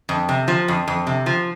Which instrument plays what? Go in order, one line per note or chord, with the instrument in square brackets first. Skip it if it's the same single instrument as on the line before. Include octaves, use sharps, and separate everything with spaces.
[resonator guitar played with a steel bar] F2
C3
F3
F2
F2
C3
F3